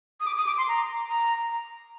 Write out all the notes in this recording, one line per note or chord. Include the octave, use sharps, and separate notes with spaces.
D#6
D6
D#6
D6
C6
A#5
A#5